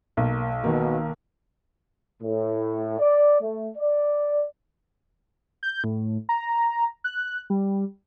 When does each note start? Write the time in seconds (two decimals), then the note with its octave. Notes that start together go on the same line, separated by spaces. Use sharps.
0.17 B1 A#3
0.64 B2 D#3 A#3
2.23 A2
3.00 D5
3.41 A3
3.77 D5
5.63 G6
5.84 A2
6.29 A#5
7.04 F#6
7.50 G3